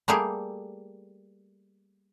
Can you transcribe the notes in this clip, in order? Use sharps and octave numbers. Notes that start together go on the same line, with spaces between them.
G3 A3 A#3 G4 G#4